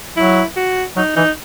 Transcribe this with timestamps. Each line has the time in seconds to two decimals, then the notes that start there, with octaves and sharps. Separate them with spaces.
0.17 F#3 E4
0.56 F#4
0.96 F#3 D#4
1.16 E3 D#4